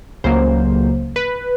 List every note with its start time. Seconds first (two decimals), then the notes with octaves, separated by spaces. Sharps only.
0.24 C#2 C#3 F#3 A#3 C5
1.16 B4